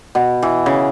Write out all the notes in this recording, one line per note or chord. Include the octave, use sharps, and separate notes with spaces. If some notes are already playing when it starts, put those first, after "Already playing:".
B2
E3
C#3